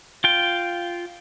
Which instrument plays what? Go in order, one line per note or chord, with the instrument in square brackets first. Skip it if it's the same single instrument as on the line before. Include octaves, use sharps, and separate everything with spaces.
[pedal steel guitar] F4 G5